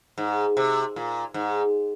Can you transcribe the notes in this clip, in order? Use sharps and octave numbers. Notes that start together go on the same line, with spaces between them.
G#2
C3
A#2
G#2